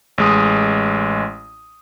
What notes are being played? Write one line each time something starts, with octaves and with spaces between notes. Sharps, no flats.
A1 G#3 D#6